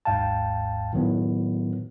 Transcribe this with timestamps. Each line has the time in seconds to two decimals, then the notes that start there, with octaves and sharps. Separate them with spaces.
0.05 G#1 D#2 G#2 F5 G5 A5
0.93 A2 D#3 F#3 B3